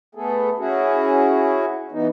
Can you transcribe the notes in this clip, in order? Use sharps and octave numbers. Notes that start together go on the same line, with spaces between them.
A3 B3 G#4 A4
C#4 E4 F#4 G#4
E3 B3 D#4